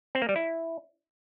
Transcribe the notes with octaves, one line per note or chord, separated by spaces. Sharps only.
C4
A#3
G3
E4